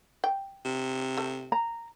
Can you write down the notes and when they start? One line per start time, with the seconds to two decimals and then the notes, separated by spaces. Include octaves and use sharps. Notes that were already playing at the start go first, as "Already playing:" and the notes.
0.24 G5
0.65 C3
1.17 A3
1.52 A#5